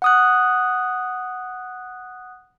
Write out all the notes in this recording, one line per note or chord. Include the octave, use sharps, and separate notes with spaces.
F#5 D#6 F#6